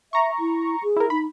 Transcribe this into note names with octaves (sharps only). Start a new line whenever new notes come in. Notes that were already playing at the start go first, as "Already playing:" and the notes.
E5 A#5 C#6
E4
G#4
E4 A#4
D#4 B5